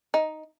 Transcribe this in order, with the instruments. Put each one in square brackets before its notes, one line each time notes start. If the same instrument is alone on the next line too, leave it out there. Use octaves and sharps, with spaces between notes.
[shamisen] D#4